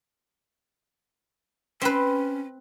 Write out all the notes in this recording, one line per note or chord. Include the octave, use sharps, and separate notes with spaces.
C4 C#4 B4